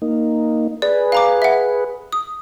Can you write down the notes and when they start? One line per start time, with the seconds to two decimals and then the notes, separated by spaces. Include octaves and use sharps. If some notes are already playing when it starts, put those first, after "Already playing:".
0.02 A#3 D#4
0.82 G#4 B4 D5
1.12 F5 A#5 D6
1.42 E5 F#5
2.12 D#6